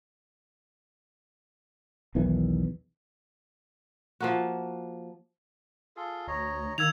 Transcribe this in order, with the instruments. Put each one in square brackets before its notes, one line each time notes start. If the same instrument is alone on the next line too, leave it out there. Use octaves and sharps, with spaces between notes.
[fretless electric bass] B1 E2 D#3 E3
[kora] F3 A#3 F#4
[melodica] F4 G#4 A4
[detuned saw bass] D2 [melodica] C#5 D#5 A#5
[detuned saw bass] D#3 [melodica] A#3 [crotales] E6 G#6 F7